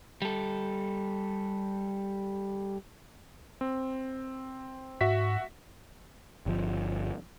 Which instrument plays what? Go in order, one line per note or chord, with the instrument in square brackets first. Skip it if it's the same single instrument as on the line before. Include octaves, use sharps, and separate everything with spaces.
[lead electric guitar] G3 A4
[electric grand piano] C4
[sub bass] G#2 [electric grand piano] F#4 E5 B6
[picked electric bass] G1 F3